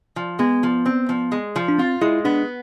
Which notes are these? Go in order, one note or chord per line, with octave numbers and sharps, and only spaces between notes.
F3
G#3 B3
F3
C4
F3
G#3
F3
D4
C4 F4
G#3 E4
B3 D4